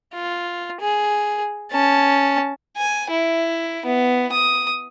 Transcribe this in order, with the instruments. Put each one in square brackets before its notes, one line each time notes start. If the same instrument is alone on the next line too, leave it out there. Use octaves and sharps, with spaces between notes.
[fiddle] F4
G#4
C#4 A5
[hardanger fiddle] G#5
E4
B3
D#6